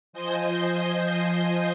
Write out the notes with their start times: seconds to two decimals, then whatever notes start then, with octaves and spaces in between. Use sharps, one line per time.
0.13 F3 C5 D#5 G#5 C6 G6